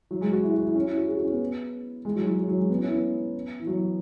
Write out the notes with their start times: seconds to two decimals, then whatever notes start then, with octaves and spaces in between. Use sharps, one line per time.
0.11 F#3
0.21 G#3
0.32 F#4
0.43 E4
0.54 F#4
0.65 E4
0.75 C#4
0.86 E4
0.97 F#4
1.07 G#4
1.16 F#4
1.24 C#4
1.32 B3
2.05 G#3
2.16 F#3
2.27 F#3
2.38 F#3
2.48 F#3
2.59 G#3
2.70 B3
2.78 C#4
2.86 E4
2.94 B3
3.59 E3
3.67 F#3